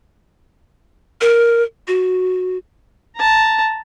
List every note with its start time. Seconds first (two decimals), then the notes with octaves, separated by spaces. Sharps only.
1.21 A#4
1.88 F#4
3.16 A5 A#5